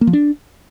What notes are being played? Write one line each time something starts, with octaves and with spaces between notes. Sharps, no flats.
A#3
F3
D4